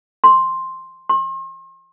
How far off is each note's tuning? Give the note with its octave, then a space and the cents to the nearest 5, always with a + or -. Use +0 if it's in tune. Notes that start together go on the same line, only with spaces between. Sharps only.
C6 +5
C6 +40